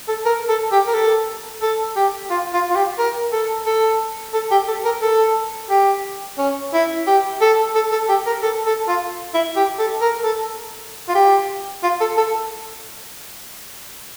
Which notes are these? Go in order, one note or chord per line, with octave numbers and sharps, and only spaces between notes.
A4
A#4
A4
G4
A#4
A4
A4
G4
F4
F4
F4
G4
A#4
A4
A4
A4
G4
A4
A#4
A4
G4
C#4
E4
G4
A4
A4
A4
G4
A#4
A4
A4
F4
E4
G4
A4
A#4
A4
F4
G4
F4
A4
A4